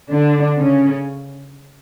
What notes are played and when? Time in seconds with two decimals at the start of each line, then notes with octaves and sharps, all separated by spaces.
0.10 D3 D4
0.57 C#3 C#4